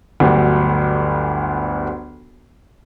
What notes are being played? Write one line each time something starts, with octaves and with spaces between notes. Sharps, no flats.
G1 D2 F#3 G4